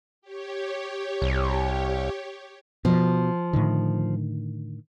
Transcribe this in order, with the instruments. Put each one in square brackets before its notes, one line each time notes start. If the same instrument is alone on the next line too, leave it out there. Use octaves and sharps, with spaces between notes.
[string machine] G4 C#5
[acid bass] C2
[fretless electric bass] B2 [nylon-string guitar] F3
[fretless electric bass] A2 D3 D#3